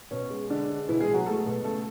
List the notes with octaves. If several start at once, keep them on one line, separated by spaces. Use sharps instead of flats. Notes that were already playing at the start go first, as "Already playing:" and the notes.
B2 C#4
G#3
D3 G#3 D4
G#3
B2 E3 E4
G#3 G#4
B2
F#3 F#4
G#3 A3 A4
B2
C#3 A3 A4